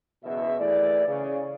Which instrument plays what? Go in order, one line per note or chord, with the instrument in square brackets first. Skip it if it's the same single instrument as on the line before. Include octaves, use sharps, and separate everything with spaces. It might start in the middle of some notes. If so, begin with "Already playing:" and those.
[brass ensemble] F#1 E2 B2 E5
E3 A3 E4 G#4 D5
C#3